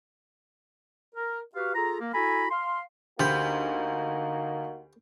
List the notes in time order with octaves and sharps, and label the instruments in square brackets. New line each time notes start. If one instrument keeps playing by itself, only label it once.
[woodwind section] A#4
F#4 G4 B4 F5
F4 G#4 A4 A#5
A#3
E4 F#4 A4 G#5 A#5 B5
F5 C6
[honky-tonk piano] D2 [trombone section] A#3 D#4 F#4 [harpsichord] G4 C5 B5